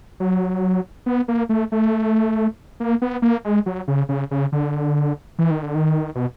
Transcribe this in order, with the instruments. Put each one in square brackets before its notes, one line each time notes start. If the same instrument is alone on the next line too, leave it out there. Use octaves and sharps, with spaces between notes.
[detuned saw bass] F#3
B3
A#3
A3
A3
A#3
B3
A#3
G#3
F#3
C#3
C#3
C#3
D3
E3
D#3
D3
D#3
B2